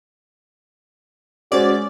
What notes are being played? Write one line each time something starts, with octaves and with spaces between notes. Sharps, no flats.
G#3 C#4 F#4 C5 D5